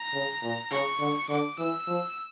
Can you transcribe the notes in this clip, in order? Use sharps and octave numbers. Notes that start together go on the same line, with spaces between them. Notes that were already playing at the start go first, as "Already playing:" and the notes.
Already playing: A#5
C#3
A#2
C#3 C#6
D3
D3 D6
E3 E6
F3